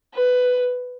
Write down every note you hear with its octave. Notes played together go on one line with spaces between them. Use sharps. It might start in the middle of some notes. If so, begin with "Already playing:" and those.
B4